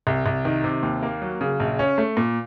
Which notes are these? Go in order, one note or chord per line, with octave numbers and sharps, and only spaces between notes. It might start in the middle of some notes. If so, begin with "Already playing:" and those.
C2
C2
D#3
C3
D#2
A#3
F#3
C#3
A#1
C#4
A3
A#2